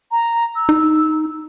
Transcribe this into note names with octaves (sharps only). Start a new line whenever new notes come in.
A#5
E6
D#4